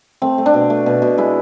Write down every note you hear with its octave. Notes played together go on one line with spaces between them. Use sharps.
A3 C4
A3
D4
B2
A3
B2
B2
G#3 E4